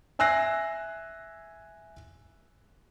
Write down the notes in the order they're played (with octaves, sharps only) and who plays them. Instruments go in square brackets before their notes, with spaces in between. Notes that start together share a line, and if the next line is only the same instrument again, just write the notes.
[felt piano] E5 G#5 E6 F#6 A#6 C7